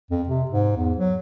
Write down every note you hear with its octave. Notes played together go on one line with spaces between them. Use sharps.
F2
C3
G#2
E2
F#3